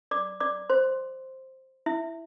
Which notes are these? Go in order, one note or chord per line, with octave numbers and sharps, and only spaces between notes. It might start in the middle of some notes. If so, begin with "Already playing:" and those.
D5 D6
D5 D6
C5 C6
E4 E5